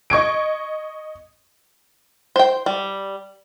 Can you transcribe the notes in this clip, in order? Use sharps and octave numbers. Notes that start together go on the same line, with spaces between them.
D#5 C#6 G#6 D7
C5 G5
G3